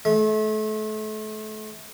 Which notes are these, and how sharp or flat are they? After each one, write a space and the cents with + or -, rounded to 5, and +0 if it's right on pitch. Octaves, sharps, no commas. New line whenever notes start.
A3 -35